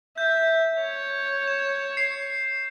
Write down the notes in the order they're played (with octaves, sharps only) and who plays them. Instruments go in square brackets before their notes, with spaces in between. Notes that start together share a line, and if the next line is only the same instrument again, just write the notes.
[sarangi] E5 [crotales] G6
[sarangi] C#5
[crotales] E7
C7